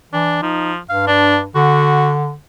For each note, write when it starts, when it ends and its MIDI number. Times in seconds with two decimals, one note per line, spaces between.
0.13 0.38 52
0.13 0.40 62
0.42 0.78 53
0.42 0.72 63
0.89 1.49 43
0.89 1.05 77
1.07 1.39 62
1.55 2.34 50
1.55 2.11 66